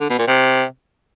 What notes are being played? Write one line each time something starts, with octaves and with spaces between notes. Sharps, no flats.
D3
B2
A#2
C3